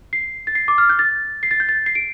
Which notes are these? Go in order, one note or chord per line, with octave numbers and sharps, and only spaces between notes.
C7
A6
C7
D6
F6
G6
A6
C7
A6
G6
A6
C7
D7